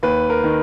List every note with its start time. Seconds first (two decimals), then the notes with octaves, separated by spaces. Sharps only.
0.03 D#2 B4
0.30 A#4
0.44 D#3